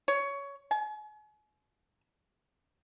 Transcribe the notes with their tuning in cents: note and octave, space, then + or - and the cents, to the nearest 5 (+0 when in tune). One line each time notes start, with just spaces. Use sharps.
C#5 +15
G#5 +40